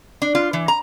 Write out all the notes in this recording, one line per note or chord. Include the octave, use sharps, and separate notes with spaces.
D4
F4
E3
A#5